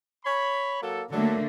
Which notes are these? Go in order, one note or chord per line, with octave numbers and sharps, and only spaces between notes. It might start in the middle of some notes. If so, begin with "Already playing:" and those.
C#5 B5
F#3 A#3 A4
D3 F#3 A3 A#3 D4 A4